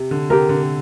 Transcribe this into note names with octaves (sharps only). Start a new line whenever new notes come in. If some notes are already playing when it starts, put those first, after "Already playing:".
Already playing: C3
D3
C3 G4 A#4
D3